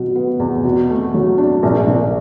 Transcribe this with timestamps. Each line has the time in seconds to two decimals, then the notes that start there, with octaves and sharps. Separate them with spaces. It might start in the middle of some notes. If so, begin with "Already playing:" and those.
Already playing: B2 F#3
0.16 B3
0.40 E2
0.64 B2
0.89 A3
1.14 F#3
1.38 D4
1.63 A#1
1.87 A#1